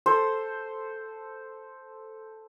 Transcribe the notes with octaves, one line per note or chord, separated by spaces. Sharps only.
A4 C5